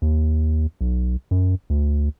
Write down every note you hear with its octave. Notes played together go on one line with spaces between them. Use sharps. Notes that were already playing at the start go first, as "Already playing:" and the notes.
D#2
B1
F#2
D2